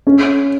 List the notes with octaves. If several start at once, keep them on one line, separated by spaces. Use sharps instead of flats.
C#4